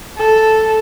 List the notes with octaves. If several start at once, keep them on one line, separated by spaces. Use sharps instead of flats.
A4